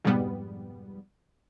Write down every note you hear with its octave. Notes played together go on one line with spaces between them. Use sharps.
F2 G#2 B2 G3 B3